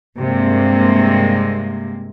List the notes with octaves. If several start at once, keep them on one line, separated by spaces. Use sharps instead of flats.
G2 C3 G#3 A#3